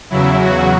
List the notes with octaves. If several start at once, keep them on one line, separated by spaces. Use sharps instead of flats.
E2 C#3 F#3 E4
F#4